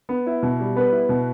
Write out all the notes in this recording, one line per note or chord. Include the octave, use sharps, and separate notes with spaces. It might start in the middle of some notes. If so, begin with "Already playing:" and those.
B3
E4
B2
G3
B3 B4
E4
B2